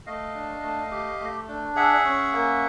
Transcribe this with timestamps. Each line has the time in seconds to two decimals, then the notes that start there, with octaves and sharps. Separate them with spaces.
0.06 A3 D#5 F5
0.34 D4
0.62 A3
0.91 G4
1.20 A3
1.48 D4
1.75 G#4 E5 F#5
2.05 C#4
2.32 A#3